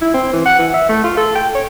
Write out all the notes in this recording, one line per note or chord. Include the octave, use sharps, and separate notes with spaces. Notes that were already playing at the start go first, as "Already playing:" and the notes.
E4
C4
E3
F#5
E3
E5
A3
F4
A4
G5
C#5